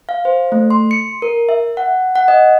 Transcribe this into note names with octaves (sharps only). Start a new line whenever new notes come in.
F5
C5
A3
C6
C#7
A#4
E5
F#5
F#5
D#5